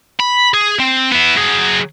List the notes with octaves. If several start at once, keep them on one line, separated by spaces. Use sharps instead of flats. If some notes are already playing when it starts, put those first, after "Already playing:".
B5
G#4
C4
B3 E4
F#3 G#4